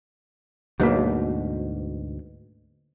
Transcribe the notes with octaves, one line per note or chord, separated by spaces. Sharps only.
D2 G#2 B2 F#3 A#3